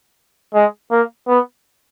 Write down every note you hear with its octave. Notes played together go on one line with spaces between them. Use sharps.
G#3
A#3
B3